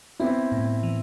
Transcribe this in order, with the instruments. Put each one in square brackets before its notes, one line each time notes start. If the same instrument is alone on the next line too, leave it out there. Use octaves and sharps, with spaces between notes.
[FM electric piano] B3 [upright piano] C4 E4
[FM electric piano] A2
E3